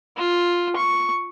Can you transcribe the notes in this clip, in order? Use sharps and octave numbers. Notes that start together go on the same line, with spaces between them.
F4
C#6